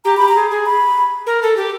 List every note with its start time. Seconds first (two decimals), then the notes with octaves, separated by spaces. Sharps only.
0.05 G4 A#5
0.17 G4 B5
0.28 A#5
0.36 G#4
0.50 G#4
0.66 B5
1.27 A#4
1.42 A4
1.57 G4